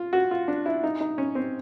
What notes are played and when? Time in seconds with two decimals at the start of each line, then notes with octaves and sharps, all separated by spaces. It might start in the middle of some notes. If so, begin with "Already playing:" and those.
Already playing: F4
0.13 F#4
0.31 F4
0.48 D4
0.66 E4
0.84 D#4
1.01 D#4
1.18 C#4
1.35 C4